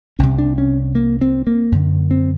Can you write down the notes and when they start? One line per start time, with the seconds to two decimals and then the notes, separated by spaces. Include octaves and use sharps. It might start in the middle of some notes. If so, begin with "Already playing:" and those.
0.19 C2 C3 C#4
0.38 D4
0.58 C#4
0.95 A#3
1.21 C4
1.47 A#3
1.72 F#2 D3
2.11 C4